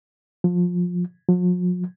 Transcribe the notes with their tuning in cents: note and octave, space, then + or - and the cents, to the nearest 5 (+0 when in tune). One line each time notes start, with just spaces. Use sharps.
F3 +20
F3 +45